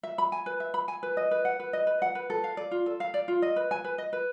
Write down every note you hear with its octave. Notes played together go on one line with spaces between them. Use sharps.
E5
B5
G#5
B4
E5
B5
G#5
B4
D#5
B4
F#5
B4
D#5
B4
F#5
B4
A4
F5
D5
F4
A4
F5
D5
F4
D#5
B4
G#5
B4
D#5
B4